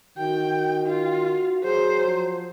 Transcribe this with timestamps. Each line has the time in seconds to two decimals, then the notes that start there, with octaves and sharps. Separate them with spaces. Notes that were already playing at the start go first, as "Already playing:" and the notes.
0.18 D#3 F#4 G5
0.87 F4
1.63 F#3 G#4 C5
2.05 F3